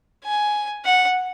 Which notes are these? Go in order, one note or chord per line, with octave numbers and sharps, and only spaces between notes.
G#5
F#5